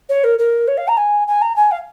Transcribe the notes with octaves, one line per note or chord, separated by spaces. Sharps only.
C#5
A#4
A#4
C#5
F5
A#5
G#5
G#5
A#5
G#5
F5